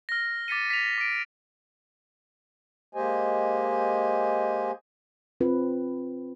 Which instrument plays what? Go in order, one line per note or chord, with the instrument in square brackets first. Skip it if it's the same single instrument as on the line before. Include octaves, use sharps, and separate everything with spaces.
[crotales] F6 A#6
D6 A6 B6 C#7 D#7
B6 F7
D6 D7
[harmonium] G#3 A#3 G4 C5 D#5 G#5
[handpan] C4 F4 B4